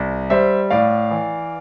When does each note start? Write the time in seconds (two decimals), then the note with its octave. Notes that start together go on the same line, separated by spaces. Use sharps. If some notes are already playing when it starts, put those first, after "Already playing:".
Already playing: C2
0.30 G3 C5 E5
0.70 A2 D5 F5
1.11 E3